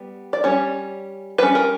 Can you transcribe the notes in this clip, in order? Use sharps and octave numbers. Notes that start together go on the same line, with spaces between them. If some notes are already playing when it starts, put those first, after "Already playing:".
Already playing: G3 B3
D5
G3 C#4 C#5
G3 C#4 B4
A#4